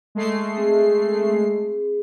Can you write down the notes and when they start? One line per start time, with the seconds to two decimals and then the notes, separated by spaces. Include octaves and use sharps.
0.15 G#3 A3 C7
0.57 C4 G#4